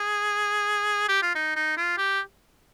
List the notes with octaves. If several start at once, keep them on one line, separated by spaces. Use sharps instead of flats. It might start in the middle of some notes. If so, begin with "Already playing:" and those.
Already playing: G#4
G4
F4
D#4
D#4
F4
G4